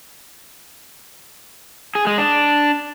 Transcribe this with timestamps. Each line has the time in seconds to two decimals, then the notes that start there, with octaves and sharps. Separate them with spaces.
1.95 G#4
2.07 G#3
2.18 D4